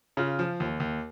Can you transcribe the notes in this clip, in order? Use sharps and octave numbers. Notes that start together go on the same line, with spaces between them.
C#3 F4
F3
D#2
D#2